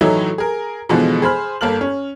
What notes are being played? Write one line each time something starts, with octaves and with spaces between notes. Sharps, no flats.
A2 E3 F#3 A3 D#4 E4
G#4 A#4
B2 D3 E3 F3 G#3 B3
G#4 C5 B5 F6
G1 A#3 A4 F6 F#7
C#4